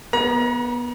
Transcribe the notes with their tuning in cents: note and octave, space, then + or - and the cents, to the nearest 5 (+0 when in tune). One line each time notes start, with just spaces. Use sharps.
B3 -20 A#5 +35